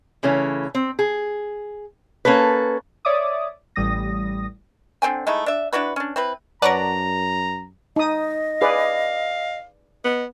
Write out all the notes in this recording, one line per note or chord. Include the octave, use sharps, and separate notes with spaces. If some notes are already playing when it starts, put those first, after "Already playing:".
C#3 E3 A3 C#4
C4
G#4
A#3 C#4 A4 B4
C#5 D5 E5 D6 D#6
A1 G3 D#6 A#6
D3 C4 G5 G#5
G#3 A3 D#4 E4
D4 E5
D4 E4 F#4 B4
C#4 D4
C4 E4 B4
F#2 A#4 B4 C#5 D5 F#5 A5 A#5
D#4 D#5 D#6
G#4 B4 D5 F5
B3 D#5